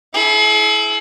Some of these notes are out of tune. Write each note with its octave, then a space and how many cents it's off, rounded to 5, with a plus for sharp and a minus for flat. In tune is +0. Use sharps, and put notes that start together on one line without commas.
E4 +0 G#4 +45